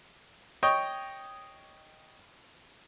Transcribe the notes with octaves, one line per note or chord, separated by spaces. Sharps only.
C#5 D#5 G5 C#6